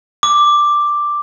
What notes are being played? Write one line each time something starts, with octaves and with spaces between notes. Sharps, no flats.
D6